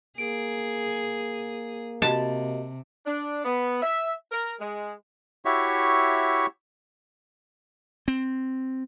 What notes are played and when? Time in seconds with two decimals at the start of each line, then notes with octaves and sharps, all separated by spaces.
0.18 A#3 G#4 D7
2.02 C3 F#4 G4 D#5 A5
3.06 D4
3.45 B3
3.82 E5
4.31 A#4
4.60 G#3
5.45 E4 F#4 G4 C#5 E5 C#6
8.08 C4